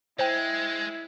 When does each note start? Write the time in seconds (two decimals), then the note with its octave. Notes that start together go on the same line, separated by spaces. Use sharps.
0.19 G#3 E4 C5 G5 G#6